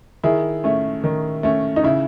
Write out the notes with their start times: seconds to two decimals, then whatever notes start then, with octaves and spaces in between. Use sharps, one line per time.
0.24 D#3 E4 G#4
0.64 A3 C#4
1.04 D#3
1.43 A3 C#4
1.76 D#4
1.83 C#3 E4